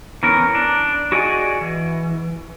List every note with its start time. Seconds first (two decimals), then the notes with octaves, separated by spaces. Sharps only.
0.23 E3 B3 C#4 A#4
0.55 D4
1.12 F#4 G#4 D5 D#5 F#5 G#5
1.61 E3